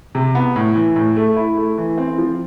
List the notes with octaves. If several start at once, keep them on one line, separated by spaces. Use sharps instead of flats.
C3
B3
A2
E3
A2
A3
E4
A3
E3
C4
F3